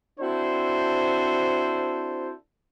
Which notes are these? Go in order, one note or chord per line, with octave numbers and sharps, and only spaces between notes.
C4 D4 E4 F#4 A4 C5